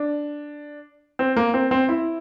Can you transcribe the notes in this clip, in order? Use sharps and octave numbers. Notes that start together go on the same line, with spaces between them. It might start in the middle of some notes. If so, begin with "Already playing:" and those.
Already playing: D4
C4
A#3
C4
C4
E4